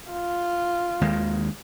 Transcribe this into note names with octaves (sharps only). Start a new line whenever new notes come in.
F4
D#2 D#3 G#3